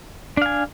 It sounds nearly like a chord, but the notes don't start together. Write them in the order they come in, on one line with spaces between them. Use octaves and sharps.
D4 F5 G#5